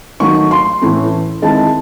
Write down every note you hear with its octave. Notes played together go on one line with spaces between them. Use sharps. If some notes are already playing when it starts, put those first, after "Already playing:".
D#3 F#3 A3 D#4 C#6
C6
A2 E3 A3 C#4 E4
D#3 G#3 C4 E4 A5